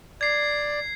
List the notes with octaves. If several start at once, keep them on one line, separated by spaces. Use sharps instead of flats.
D5 G#6 C7